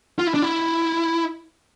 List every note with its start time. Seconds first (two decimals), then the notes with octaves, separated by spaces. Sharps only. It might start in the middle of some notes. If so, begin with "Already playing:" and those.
0.19 F4
0.27 E4
0.34 D4
0.42 E4